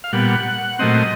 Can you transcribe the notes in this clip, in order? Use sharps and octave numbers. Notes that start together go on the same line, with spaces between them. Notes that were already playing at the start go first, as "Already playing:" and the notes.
F5
A#2 G3 B3 F#5
A#2 F#3 A3 C4 D#5